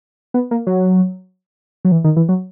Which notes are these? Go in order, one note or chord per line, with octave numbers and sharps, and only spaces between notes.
B3
A#3
F#3
F#3
E3
D#3
E3
F#3